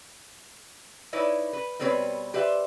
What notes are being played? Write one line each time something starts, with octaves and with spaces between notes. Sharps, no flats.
D#4 E4 B4 C#5 D5
B4
B2 G3 C4 B4 C#5
G4 B4 C5 D5 E5